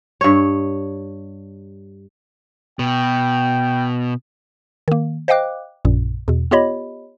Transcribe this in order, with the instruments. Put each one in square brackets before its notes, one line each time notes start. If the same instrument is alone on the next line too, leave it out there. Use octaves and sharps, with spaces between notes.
[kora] G2 C#5
[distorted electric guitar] B2 [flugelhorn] G5
[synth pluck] D#3 A#3
C5 D#5 F5 G5 D6 F#6
A#1 F#2 A#2
E2 B2
B3 F4 G4 C#5 D#5 B5